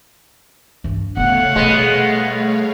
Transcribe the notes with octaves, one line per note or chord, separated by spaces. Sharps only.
G2 E3
C#3 A3 B3 C#5 F5 F#5
B2 G3 G#3 B3